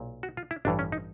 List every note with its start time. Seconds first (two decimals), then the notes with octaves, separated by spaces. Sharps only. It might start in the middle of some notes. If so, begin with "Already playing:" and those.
Already playing: B1 A#2
0.23 F#4
0.37 F4
0.51 E4
0.65 A1 G2 E3 D4
0.79 C#4
0.92 D#4